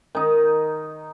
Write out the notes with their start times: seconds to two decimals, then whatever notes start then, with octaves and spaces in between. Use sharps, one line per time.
0.15 D#3 D#4